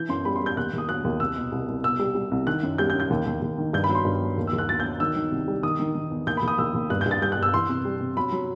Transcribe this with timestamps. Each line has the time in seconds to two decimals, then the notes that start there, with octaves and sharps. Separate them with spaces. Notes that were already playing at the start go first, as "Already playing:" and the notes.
Already playing: E3 G6
0.09 F#2 C6
0.25 G3 B5
0.36 C6
0.41 G3
0.46 G6
0.57 D#2 F#6
0.73 D#2 D#6
0.89 F#3 F#6
1.04 D#2
1.20 C2 E6
1.36 B2
1.52 C2
1.68 C2
1.84 B2 E6
2.00 G3
2.15 G3
2.31 C2
2.47 D#3 F#6
2.63 F#2
2.78 G3 G6
2.90 G6
2.94 F#2
3.00 G6
3.10 D#2
3.26 D#2
3.42 D#2
3.58 D#3
3.73 G2 G6
3.84 B5
3.89 F#3
3.95 C6
4.05 G2
4.21 F#3
4.37 D#2
4.47 E6
4.53 D#2
4.58 F#6
4.68 F#3 A6
4.80 F#3 G6
5.00 D#3 E6
5.16 D#3
5.32 C2
5.48 G3
5.63 D#3 D#6
5.80 D#3
5.95 D#3
6.11 E2
6.27 D#2 G6
6.37 B5
6.43 D#2
6.48 D#6
6.58 D#2 E6
6.74 D#2
6.90 G2 F#6
7.01 G2 G6
7.11 A6
7.22 G3 G6
7.32 F#6
7.37 G2
7.43 E6
7.54 E3 C6
7.69 C3
7.85 G3
8.01 C3
8.17 F#3 B5
8.32 F#3